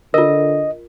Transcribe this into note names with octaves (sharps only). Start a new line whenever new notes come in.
D3 F4 A#4 D#5